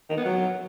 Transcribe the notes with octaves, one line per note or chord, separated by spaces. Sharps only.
D#3
B3
F#3